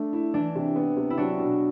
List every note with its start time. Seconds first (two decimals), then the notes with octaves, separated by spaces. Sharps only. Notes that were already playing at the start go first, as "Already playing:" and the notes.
Already playing: A3 D4
0.13 E4
0.34 E3 D4
0.55 C3
0.76 B3
0.96 C3
1.10 E4
1.17 F#3 D4 F#4
1.39 B2